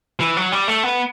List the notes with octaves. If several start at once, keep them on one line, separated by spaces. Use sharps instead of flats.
E3
F#3
G3
A3
B3